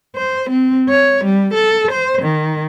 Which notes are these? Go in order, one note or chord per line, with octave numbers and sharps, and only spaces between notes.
C5
C4
C#5
G3
A4
C5
D#3